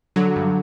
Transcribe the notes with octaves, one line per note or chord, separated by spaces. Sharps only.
D3 F#3
G2